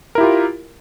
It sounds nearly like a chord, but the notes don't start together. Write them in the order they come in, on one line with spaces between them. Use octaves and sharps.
A#4 E4 G4 F4